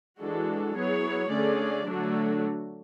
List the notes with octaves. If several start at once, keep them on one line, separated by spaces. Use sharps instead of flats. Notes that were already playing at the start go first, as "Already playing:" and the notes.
E3 G#3 D4 F#4 A4
F#3 B3 E4 G#4 C#5
D3 A3 C#4 G#4 D5
D3 F#3 A3 D4 F#4